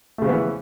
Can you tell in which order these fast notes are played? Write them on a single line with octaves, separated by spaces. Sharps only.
A3 C#3 F3 B3 E3